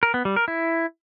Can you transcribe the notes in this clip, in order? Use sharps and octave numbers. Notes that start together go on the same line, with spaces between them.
A#4
B3
G3
A#4
E4